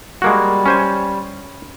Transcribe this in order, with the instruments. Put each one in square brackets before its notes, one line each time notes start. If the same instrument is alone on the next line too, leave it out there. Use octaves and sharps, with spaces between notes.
[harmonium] G3 [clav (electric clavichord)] G#3 A#3 F#4
[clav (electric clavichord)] C#4 C5 G#5